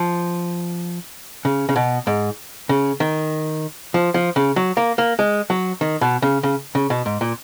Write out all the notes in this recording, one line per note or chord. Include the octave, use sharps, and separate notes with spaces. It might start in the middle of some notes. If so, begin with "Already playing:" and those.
Already playing: F3
C#3
C#3
B2
G#2
C#3
D#3
F3
F3
C#3
F#3
A#3
A#3
G#3
F#3
D#3
B2
C#3
C#3
C#3
B2
G#2
A#2